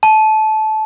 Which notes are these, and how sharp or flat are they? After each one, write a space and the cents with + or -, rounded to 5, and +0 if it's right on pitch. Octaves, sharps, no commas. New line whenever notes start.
A5 -20